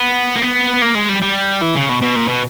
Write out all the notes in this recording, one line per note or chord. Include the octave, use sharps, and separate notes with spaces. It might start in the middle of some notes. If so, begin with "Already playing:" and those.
Already playing: B3
A#3
B3
A#3
G#3
G3
G3
E3
C#3
B2
B2
A#2
B2